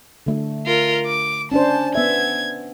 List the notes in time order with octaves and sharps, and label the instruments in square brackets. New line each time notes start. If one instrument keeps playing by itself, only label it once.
[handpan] D3 A3
[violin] F4 A#4
D6
[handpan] C#4 D4 C5 [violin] A5
[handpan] B3 E5 [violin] G#6